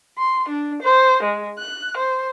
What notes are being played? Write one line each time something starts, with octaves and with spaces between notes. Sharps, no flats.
C6
D4
C5
G#3
F#6
C5